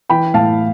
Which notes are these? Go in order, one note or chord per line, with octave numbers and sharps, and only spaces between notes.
E3 G5 B5
A2 F5 A5